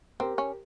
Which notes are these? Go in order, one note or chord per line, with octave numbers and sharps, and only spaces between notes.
C4 G4 A#4
C#4